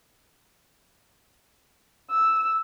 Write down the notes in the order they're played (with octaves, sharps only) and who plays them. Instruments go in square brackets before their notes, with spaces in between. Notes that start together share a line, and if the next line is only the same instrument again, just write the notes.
[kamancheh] E6